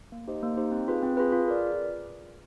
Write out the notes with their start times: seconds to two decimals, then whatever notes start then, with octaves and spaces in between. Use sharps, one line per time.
0.12 A#3
0.27 D#4 G4 C5 D#5
0.42 A#3
0.57 D#4 G4 C5 D#5
0.72 C4
0.88 F4 G#4 B4
1.02 C4
1.17 F4 G#4 B4
1.32 F4
1.48 A#4 D5